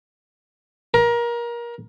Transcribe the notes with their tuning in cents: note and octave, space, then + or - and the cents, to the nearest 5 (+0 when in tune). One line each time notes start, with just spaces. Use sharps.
A#4 +25